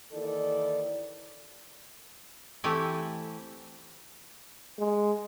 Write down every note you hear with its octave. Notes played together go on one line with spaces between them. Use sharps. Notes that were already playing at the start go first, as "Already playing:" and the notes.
D#2 D#3 E3 A4 D5
E3 A3 C4 E4 G4 B4
G#3